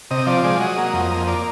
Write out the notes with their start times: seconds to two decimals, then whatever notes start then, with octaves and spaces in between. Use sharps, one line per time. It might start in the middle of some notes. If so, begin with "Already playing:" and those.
0.11 C3 D#5
0.27 F3 D5
0.44 G#3 D5
0.60 F#3 D#5
0.78 A#3
0.93 F2
1.11 A#3
1.27 A#3 D5